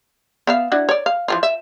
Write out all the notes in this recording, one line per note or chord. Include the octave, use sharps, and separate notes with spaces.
B3 E5 F5
D4 E4 F#4
C#5 D5
F5
E3 F3 F4
E5